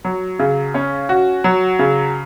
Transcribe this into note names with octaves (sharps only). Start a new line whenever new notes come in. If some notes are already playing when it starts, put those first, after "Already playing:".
F#3
C#3
C#4
F#4
F#3
C#3